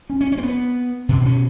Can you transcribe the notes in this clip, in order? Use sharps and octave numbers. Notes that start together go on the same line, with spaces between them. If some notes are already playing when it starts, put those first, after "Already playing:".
C#4
C#4
C#4
C4
B3
B2 B3
C4
C#4